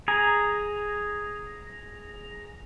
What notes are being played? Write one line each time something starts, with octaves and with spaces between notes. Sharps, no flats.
G#4 A#5